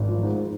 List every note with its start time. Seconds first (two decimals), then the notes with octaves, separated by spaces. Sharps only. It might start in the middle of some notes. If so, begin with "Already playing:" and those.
Already playing: G#1
0.09 F3
0.23 G#2